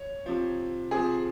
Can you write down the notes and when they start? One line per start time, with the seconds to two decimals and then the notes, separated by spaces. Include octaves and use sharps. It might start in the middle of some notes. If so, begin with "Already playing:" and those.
Already playing: C#5
0.26 C3 F3
0.91 C3 F3 G#4